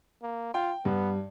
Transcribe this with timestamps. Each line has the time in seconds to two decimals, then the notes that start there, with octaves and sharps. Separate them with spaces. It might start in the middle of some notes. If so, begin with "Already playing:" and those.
0.23 A#3
0.54 F4 G5
0.85 G2 B3